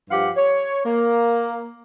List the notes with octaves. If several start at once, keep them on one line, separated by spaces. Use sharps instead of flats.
G2 F3 G4 F5 F#5
C#5
A#3